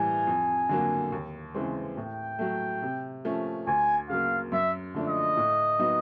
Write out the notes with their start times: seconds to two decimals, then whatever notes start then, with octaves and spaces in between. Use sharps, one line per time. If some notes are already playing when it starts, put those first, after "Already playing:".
Already playing: A2 E3 G3 G#5
0.27 F2
0.69 D3 F#3 A#3
1.12 D#2
1.55 C#3 E3 G#3 C4
1.97 A2 G5
2.39 F#3 A3
2.82 C3
3.25 F3 A3 C#4
3.67 D2 G#5
4.09 C#3 F#3 A#3 F5
4.52 F#2 E5
4.94 D3 F3 A3 D4
5.08 D#5
5.37 A2
5.79 F#3 B3 D#4